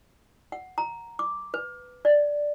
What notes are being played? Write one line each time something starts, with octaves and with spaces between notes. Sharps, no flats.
F#5
A#5
D6
B4
D5